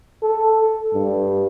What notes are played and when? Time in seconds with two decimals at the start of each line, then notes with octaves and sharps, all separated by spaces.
0.23 A4
0.94 G2